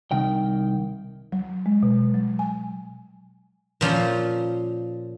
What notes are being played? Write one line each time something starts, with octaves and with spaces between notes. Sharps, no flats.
C2 D#3 G5
F#3
G#3
B2
F#3
G#5
A#2 F3 C#4 C6